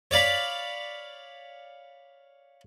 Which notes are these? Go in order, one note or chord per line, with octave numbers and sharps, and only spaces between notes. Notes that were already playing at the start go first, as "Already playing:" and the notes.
C#5 D5 F5 B5